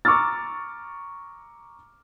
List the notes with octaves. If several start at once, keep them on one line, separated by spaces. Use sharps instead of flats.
A#5 C#6 D6 E6 F6 A6